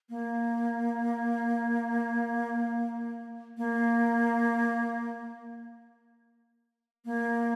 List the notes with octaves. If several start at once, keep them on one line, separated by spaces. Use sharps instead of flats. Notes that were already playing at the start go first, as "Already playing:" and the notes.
A#3
A#3
A#3